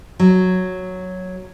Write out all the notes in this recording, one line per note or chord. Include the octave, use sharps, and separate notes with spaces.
F#3